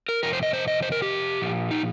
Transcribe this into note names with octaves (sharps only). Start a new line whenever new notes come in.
A#4
F2 C3 A#4
C5
D#5
C5
D#5
C5
A#4
G4
A#2 F3
D#4